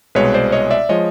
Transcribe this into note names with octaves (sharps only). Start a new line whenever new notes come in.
C2 B2 G#3 B4 C#5
C5 D5
C#5 D#5
D5 E5
F3 G#3 C#5 D#5